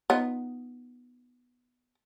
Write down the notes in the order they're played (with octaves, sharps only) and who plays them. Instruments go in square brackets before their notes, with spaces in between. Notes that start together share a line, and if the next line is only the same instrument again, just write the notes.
[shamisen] B3 D#4 F4